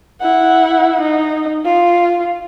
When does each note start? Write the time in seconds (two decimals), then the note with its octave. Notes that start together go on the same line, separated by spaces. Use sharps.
0.21 E4 F#5
1.01 D#4
1.65 F4